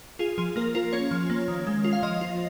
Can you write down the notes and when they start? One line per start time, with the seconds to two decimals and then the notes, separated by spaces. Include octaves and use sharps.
0.19 F4 G#4
0.38 F3 G#4
0.56 A#3 A#4
0.75 F4 A#4
0.93 C#4 C#5
1.11 F3
1.30 A#3
1.48 D#3
1.67 G#3
1.84 F4
1.93 F5
2.03 F3 D#5
2.21 F4